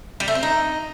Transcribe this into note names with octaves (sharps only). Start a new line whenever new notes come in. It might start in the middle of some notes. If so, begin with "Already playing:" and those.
G3
A3
C4
D#4